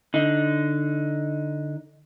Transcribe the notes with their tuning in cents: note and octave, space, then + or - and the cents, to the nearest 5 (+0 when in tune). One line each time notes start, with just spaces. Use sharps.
D3 +0 D#4 +10